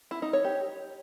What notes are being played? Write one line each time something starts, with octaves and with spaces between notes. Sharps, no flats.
E4
D#4
C#5
G4